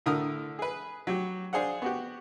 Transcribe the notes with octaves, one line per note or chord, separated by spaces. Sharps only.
A2 D3 A#4 D#6 F6
G#4 B4
F#3 G4
D4 G#4 C5 F5 F#5
B3 F#4 G4